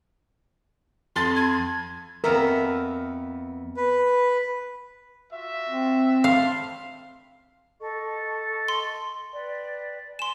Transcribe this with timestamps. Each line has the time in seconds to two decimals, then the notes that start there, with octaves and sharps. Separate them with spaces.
1.16 F2 C6 A6
1.36 G#6
2.24 F2 B3 A#4 E5
3.77 B4
5.31 F4 F#4 E5
5.70 C4
6.24 F5 A5 B5 C6
7.80 A4 D#5 C#6
8.68 C6
9.32 B4 D5 G5
10.19 G#5 C6 E7